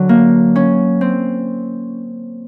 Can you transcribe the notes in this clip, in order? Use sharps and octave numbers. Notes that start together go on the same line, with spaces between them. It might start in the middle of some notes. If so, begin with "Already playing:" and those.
Already playing: D3 F#3
A#3
C#4
C4